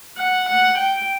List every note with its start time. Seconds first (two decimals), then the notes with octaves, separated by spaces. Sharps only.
0.17 F#5
0.48 F#5
0.78 G5